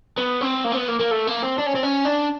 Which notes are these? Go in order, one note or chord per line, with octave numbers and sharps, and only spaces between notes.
B3
C4
A#3
C4
B3
A#3
A#3
A3
A#3
C4
D4
C#4
C4
C#4
D4